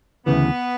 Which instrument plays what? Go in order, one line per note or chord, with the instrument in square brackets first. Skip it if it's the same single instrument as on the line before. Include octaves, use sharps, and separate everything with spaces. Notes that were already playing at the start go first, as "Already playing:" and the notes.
[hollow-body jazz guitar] D2 C#3 E3 [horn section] B3